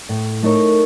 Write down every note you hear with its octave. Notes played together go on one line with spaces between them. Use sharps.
A2
A3 D#4 A#4 C#5